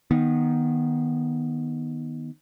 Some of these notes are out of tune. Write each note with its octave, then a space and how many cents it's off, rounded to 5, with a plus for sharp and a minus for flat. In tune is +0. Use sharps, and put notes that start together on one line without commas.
D#3 +0 B3 -20